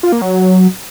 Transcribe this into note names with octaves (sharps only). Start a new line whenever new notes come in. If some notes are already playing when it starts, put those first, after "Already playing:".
F4
A#3
F#3